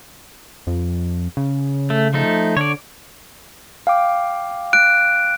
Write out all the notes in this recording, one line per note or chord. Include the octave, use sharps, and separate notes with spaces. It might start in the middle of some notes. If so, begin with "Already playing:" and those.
F2
C#3
A3
F3 A3 D#4
D3 C#5 D5
F5 G5 D6
F#6 D7